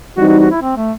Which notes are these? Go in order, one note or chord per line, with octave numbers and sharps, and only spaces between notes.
E3 G3 C4 D#4 F#4
F#4
F#4
E4
C4
A3